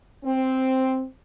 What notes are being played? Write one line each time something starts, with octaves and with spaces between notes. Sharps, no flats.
C4